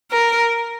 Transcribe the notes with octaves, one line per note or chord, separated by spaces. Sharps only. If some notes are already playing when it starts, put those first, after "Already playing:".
A#4